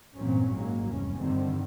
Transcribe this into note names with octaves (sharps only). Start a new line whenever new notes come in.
G2 A#2 E3 F#3 C4 C#4
G#1 A#2 F#3 G#3 A#3
F1 E2 G2 C#4
G2 D3 D#3 G3 C4